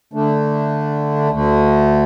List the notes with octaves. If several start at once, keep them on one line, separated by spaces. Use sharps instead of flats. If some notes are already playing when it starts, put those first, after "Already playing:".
D3 A3 D4
D2 D3 A3